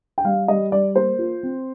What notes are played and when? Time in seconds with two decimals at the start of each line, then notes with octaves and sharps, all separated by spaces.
0.18 G5
0.25 G3 F5
0.48 G3 D#5
0.72 G3 D5
0.96 A#3 C5
1.19 F4
1.43 C4